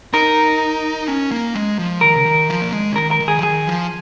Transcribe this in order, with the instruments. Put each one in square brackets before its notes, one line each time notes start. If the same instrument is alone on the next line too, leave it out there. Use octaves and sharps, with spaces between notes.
[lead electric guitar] D#4 [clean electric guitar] A#4
[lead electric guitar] C#4
A#3
G#3
F3
[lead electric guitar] D#3 [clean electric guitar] A#4
[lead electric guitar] C#3
D#3
F3
A#3
G#3
C#3
[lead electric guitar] D#3 [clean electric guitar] A#4
[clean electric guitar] A#4
[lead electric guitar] D#3
[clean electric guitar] G#4
[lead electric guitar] F3
[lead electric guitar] D#3 [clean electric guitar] G#4
[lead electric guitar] F3